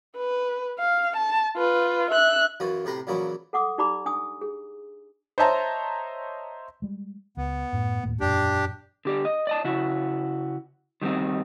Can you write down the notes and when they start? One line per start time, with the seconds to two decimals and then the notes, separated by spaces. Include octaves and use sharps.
0.17 B4
0.79 F5
1.17 A5
1.56 F4 B4
2.11 E5 F#6
2.60 F#2 E3 F4 F#4
2.85 A2 C3 B4 A#5 C6
3.07 A#2 C#3 E3 F#3 E4
3.53 A4 F#5 D6 D#6
3.78 D#4 G4 D5 A#5 B5 D6
4.06 D4 G#5 D#6
4.41 G#4
5.38 C5 C#5 D#5 E5 A5 A#5
6.82 G3 G#3
7.37 C#2 B3
7.73 F#2 A2
8.03 D#2 A2 A#3
8.20 E1 F#2 A#2 D4 G4
9.05 D3 G4 D5
9.25 D#5
9.47 D5 D#5 A5
9.64 C#3 E4 F#4
11.01 D#3 G3 A3 C4 D#4